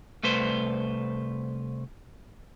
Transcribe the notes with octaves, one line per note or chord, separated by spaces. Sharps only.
C2 A3 B4 C5